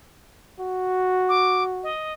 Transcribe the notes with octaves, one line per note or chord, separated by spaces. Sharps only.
F#4
D6
D#5